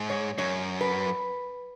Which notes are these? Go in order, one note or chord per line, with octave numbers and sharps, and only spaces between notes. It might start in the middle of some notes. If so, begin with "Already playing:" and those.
Already playing: G#2
C#5
F#2 C#5
B4